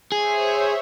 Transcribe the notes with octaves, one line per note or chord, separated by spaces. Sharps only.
G#4 C5 C#5 E5